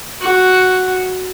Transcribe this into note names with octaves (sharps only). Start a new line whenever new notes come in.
F#4